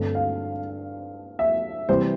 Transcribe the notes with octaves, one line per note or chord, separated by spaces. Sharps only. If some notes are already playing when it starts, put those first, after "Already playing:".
Already playing: G2 D3 A3 C4
F5
E5
C3 E3 G3 C5